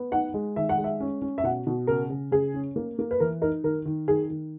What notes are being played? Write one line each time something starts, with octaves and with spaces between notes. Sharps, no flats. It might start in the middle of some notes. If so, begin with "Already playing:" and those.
Already playing: B3
D#4 F#5
G#3
D#3 E5
F#5
G#3
E5
C#4
C#4
E5
B2 F#5
B2
C#3 A#4
C#3
C#3 G#4
C#4
A#3
A#3
B4
E3 A#4
D#4 A#4
D#3 A#4
D#3
D#3 G#4
D#3